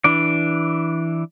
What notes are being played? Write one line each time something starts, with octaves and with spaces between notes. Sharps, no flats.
E3 D4 D5